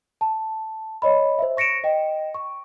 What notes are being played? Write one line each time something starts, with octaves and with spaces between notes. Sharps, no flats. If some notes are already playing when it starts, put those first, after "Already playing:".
A5
C#5 D#5 B5
C5 E5
C#6 A#6 C#7 D7 E7
D#5 G5
C#6